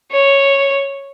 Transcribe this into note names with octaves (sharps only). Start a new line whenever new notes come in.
C#5